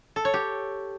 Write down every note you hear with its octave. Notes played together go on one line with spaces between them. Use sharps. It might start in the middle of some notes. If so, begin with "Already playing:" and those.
A4
C#5
G4